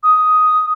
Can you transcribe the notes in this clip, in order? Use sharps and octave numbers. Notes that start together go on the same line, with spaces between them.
D#6